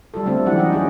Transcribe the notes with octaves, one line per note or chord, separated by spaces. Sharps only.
G3 F4 A4
D3 A3 C4 A4
E3 F#3 C#4 G4 F#5
G#3 D#4 D#5
C#4 G4 G#4